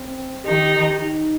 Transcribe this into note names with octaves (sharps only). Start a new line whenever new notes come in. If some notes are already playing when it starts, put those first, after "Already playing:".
Already playing: C4
D#3 D#4 G4
D#4